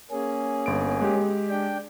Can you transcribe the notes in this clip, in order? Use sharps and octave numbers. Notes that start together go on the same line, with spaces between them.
A#3 C#4 G#4
G1 D7
G#3 G4
D4 G5